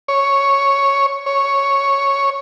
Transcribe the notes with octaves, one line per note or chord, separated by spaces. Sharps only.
C#5
C#5